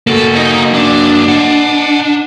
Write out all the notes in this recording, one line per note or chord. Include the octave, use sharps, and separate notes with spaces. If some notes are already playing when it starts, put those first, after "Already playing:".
A#3 F#4 A4
D#4 D#5
D4
D#5 F#5